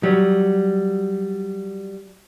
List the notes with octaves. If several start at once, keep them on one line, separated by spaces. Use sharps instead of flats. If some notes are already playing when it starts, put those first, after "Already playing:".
F#3 G3